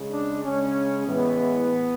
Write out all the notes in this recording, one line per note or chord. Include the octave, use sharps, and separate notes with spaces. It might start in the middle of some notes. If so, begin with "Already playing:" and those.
Already playing: C#3 G#3
D4
C#3 G#3 C#4
A2 E3 G#3 B3